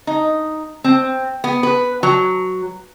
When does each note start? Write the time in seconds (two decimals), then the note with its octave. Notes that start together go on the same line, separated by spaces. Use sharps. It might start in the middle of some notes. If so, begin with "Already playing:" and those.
0.07 D#4
0.84 C4
1.44 B3
1.63 B4
2.03 F#3